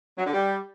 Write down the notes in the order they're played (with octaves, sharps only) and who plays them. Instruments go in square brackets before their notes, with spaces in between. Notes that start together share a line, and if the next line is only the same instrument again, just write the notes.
[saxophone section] F#3
D3
G3